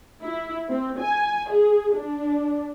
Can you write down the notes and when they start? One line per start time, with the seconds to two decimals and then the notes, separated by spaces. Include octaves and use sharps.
0.21 E4
0.69 C4
0.99 G#5
1.48 G#4
1.93 D4